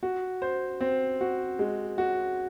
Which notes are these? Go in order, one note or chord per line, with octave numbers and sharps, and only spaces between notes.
F#4
C5
C4
F#4
G#3
F#4